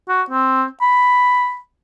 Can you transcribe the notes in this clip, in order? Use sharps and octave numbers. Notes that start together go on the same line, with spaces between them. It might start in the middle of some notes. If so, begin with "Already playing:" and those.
F#4
C4
B5